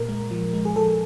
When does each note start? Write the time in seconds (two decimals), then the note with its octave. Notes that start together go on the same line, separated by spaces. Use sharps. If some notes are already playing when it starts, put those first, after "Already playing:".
Already playing: A#2 A#4
0.09 G#3
0.31 F3
0.53 G#3
0.65 G#4
0.76 F3 A4